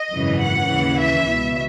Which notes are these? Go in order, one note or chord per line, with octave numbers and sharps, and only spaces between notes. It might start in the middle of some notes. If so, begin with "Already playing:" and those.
Already playing: D#5
G#1 F#2 C#3 E3
F#5
D#2 C#3 E3
E5
C#2 B2